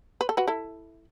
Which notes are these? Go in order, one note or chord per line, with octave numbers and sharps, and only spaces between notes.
B4
A4
F#4 B4
E4 A4